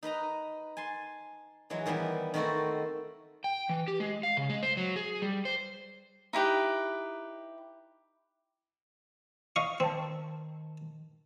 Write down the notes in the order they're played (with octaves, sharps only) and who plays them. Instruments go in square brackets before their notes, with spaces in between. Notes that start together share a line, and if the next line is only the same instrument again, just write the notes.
[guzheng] D#4 B4 D#5 A#5
G#5 A5 C6
E3 F#3 G#3
D#3 E3 G3 B3
D#3 A3 C4 F#4 A4 B4
[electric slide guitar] G5
E3
G4
G#3
F5
C#3
G#3
C5
F#3
G#4
G3
C5
[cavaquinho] D#4 E4 G4 B4
[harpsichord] D#5 F5 C#6
[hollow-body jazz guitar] D#3 A5 [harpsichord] C4